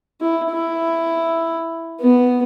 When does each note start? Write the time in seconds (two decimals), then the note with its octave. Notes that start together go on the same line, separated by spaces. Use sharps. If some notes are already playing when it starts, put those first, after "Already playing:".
0.21 E4
0.51 E4
2.01 B3